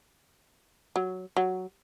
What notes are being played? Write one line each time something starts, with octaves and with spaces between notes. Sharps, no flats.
F#3
F#3